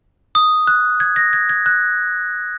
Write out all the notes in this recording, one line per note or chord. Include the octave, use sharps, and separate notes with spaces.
D#6
F#6
G#6
A#6
G#6
G#6
F#6